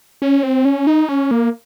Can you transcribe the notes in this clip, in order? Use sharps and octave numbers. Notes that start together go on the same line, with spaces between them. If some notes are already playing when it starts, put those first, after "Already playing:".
C#4
C4
C#4
D#4
C#4
A#3